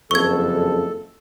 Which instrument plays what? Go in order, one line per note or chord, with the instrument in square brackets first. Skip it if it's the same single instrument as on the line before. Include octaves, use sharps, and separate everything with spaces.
[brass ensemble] F#1 [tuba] F2 [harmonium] A4 [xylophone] C#6 G#6